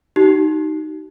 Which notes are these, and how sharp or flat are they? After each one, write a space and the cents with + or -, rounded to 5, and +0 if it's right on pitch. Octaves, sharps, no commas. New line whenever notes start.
D#4 +0 G4 -45